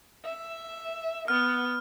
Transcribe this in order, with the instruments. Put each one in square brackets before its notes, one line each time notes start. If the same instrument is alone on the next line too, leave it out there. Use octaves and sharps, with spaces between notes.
[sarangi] E5
[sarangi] B3 [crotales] F6